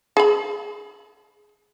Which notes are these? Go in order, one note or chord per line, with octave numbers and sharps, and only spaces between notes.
G#4 B5